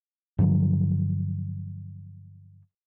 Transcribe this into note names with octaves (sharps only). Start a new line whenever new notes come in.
G2 D3 F3 F#3